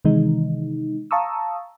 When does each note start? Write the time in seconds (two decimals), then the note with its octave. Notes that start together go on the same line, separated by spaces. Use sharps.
0.05 C3 D#3 E3 G#3 D#4
1.11 F5 A5 A#5 C#6 D#6 E6